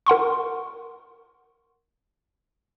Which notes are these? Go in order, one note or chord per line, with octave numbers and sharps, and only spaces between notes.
A#4 F#5 C6 C#6